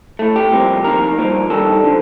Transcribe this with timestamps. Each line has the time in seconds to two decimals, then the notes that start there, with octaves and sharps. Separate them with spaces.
0.19 A2 A3
0.36 G4
0.51 C2 C3 F3 A#3
0.84 F2 D#3 A#3 A#4
1.18 G2 F3 A#3
1.50 G2 D#3 G3 A4
1.84 D3 F3